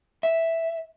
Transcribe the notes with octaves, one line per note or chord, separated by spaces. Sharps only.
E5